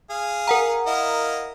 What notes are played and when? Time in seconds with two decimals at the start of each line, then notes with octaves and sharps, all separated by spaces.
0.10 G#4 F5
0.48 A#4 F#5 A#5
0.87 E4 D#5 F5